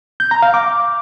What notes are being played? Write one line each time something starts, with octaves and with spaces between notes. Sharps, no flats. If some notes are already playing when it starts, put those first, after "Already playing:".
G6
A#5
F5
D6